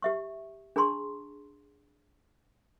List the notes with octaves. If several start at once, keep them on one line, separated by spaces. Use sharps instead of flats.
G4 E5 C#6
D4 G#4 A5 A#5 C6 C#6